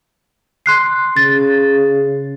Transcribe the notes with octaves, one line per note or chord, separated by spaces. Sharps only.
C6 F#6 C7
C#3 A6